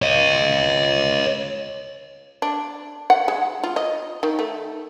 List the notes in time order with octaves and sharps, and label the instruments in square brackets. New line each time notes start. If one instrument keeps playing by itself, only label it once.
[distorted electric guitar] C#5 D#5
[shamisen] D4
F#5
G#3
F4
D#5
D#3
A3